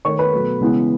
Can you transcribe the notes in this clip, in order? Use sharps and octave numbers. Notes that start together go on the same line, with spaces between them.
D#3 A3 C#5 C#6
B4 B5
B2 F#3 A3
C#3 E3 G#3 B3